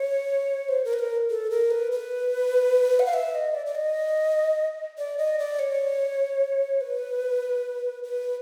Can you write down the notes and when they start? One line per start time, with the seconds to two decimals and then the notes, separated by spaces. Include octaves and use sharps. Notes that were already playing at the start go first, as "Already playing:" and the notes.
Already playing: C#5
0.69 C5
0.85 A#4
0.93 B4
0.99 A#4
1.30 A4
1.51 A#4
1.71 B4
1.92 B4
2.99 F#5
3.06 F5
3.14 E5
3.34 D#5
3.55 D5
3.66 D5
3.75 D#5
4.98 D5
5.18 D#5
5.39 D5
5.59 C#5
6.81 B4
8.03 B4